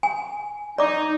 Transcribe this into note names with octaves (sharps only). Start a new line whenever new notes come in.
G#5
D#4 D5 D6